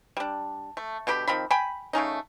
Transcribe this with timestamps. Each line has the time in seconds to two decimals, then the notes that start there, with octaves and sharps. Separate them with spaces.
0.17 G3 D4
0.77 A3
1.07 B2 D3 G4 B5
1.28 D#3 F3 C4 B5
1.51 G5 G#5 B5
1.93 C#3 A3 C#4 D#4